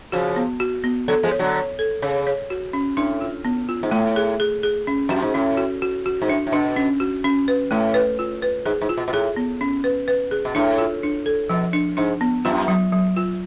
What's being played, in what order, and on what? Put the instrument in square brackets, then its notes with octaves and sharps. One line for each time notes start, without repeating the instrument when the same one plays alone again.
[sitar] C#3 F3 [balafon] F#4
[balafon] B3
F#4
B3
[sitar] D3 F#3 [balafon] A4
[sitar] F3 G#3
[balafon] C#5
[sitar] D3 F#3
[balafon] C#5
A4
[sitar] C#3 [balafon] C#5
[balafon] C#5
F#4
C#4
[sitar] A2 [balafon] D4
[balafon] F4
B3
F4
[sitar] G#2
[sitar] A2 [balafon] A3
[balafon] G#4
G#4
G#4
C#4
[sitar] F#2 [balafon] F#4
[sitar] G#2
[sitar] A2 [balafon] C#4
[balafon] F#4
F#4
F#4
[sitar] G#2
[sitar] A2 [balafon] D4
[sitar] A2
[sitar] B2 [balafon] D4
[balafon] C#4
F#4
C#4
B4
[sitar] A2 [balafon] A3
[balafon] B4
F4
B4
[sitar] G#2 [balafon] G#4
[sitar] G#2
[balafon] F4
[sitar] B2
B2
[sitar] A2 [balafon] G#4
[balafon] B3
C#4
B4
B4
G#4
[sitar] B2
[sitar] A2 [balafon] D4
[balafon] F4
D4
A4
[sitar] B2 [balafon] F3
[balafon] D4
[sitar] G#2 [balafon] D4
[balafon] B3
[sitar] F#2 [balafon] F4
[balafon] F#3
F#3
F4